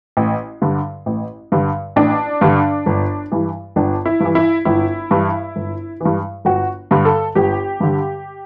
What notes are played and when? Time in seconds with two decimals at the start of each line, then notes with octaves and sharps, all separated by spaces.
0.17 A1
0.62 G2 D3
1.06 A1
1.52 G2 D3
1.96 A1 D4
2.41 G2 D3
2.86 G1
3.32 G2 E3
3.76 G1 D4
4.06 E4
4.20 G2 E3
4.35 E4
4.65 G1 E4
5.11 G2 E3
5.56 G1
6.01 G2 E3
6.45 G1 F#4
6.91 G2 D3
7.05 A4
7.35 G1 G4
7.80 G2 D3